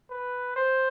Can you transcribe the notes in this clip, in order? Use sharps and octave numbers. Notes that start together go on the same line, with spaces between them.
B4
C5